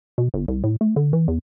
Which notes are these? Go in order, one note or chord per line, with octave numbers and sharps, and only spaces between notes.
B2
G1
C2
A2
A3
D3
E3
E2